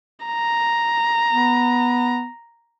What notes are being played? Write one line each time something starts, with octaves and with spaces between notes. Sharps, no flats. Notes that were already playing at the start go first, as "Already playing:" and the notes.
A#5
B3